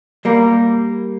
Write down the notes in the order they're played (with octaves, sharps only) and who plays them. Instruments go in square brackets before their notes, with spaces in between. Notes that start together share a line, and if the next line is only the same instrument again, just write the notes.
[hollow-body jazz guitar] G3 A#3